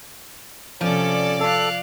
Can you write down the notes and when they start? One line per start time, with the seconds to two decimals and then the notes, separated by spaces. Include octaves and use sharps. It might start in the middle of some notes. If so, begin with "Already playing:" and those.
0.81 C3 F3 C#4 A4 D5
1.40 A4 F5 F#6